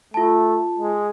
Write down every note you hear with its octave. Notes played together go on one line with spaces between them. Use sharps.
A3 F4 A5
G#3